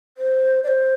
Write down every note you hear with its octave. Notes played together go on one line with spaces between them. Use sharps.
C5
D5
C5